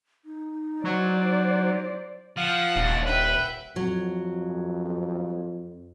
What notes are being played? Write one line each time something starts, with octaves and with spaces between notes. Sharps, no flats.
D#4
F#3 C5 D5
F3 F5 F#5
D#1 D#2 D4
B4 E5 F#5 G5
F2 F#3